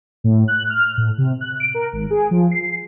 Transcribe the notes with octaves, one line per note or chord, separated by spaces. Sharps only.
A2
F#6
F6
A2
C3
F#6
D7
A#4
G#1
G#4
F3
C7